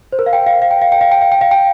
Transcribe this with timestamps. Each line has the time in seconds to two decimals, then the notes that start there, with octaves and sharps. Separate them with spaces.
0.13 C5
0.19 A#4
0.26 F5
0.33 G5
0.46 F5
0.62 F5
0.71 G5
0.82 F5
0.92 G5
1.01 F5
1.12 G5
1.22 F5
1.32 G5
1.41 F5
1.51 G5